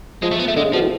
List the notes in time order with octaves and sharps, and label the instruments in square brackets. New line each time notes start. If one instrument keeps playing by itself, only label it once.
[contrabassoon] F3 [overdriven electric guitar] G#3
[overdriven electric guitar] A3
B3
A3
[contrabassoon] D3 [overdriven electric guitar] G#3
[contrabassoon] C#3
[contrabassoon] B2 [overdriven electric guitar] F3
[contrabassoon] A2